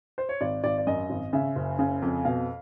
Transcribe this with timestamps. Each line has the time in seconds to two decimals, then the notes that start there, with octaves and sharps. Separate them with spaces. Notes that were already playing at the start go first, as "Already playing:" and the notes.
0.18 C5
0.29 C#5
0.41 G#1 D5
0.64 G#1 D5
0.78 D5
0.87 F#2 D#5
1.10 G#1
1.33 C#3 E5
1.56 F#1
1.79 C#3
2.02 F2
2.25 B2 F5